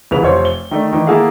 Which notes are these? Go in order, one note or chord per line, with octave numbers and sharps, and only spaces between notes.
C2 C#3 E3 B4 F7
F1 C5 C#5
G7
D#3 A3 D4
D#3 E3
A#3 E4 G#4 A4 F5 F#5